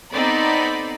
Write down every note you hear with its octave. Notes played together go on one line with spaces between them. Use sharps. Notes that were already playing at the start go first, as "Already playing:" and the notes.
B3 C4 D#4 A4 D5 B5